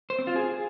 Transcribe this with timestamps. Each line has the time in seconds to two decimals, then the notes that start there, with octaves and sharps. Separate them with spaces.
0.10 C5
0.19 C4
0.27 F4
0.36 G#4